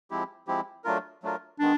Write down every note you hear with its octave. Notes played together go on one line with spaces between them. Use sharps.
F3 G#3 C4 E4 G4
F3 G#3 C4 E4 G4
F#3 A3 D4 F4 A#4
F#3 A3 D4 F4 A#4
D#3 G#3 B3 D4